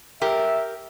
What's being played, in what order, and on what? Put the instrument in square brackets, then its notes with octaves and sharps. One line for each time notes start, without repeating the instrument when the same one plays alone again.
[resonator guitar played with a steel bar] G4 A#4 [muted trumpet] E5